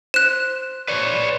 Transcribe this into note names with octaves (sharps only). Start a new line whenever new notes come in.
C5 F#6 E7
B4 C#5 D5